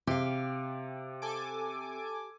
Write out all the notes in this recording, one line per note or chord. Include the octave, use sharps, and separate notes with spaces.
C3 G4 F5
A4 G#5 D6